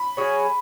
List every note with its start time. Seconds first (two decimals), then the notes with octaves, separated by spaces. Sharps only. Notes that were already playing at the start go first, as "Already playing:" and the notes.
Already playing: B5
0.17 F#3 C#4 G#4